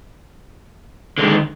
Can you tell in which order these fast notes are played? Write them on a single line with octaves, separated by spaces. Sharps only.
D3 G#3 D#3